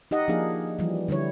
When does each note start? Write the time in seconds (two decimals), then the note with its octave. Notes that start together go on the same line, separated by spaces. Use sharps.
0.11 D#4 G4 D#5 F#5
0.28 F3 A#3 D4 D#4 G#4 F5
0.79 E3 F3 G3
1.08 D3 G3 E4 C#5